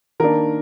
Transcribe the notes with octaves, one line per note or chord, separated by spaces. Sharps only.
D#3 A#3 D4 A#4